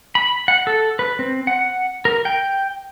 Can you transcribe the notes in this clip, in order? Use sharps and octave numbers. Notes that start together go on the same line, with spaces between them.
B5
F#5
A4
B4
C4
F#5
A#4
G5